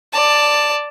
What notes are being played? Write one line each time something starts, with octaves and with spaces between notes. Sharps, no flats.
D5 A5